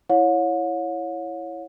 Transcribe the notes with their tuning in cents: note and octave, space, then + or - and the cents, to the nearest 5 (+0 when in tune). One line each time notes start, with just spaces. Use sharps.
E4 +0 C#5 +0 F#5 -45